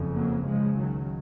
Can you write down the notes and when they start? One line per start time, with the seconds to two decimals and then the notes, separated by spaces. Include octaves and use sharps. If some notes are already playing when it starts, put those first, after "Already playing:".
Already playing: F#1 F2 C#3
0.14 F#3 A#3
0.46 C#2 C#3 F3 G#3
0.78 D#3 F#3